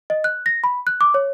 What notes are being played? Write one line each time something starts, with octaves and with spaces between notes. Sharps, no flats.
D#5
F#6
A#6
B5
F#6
D6
C#5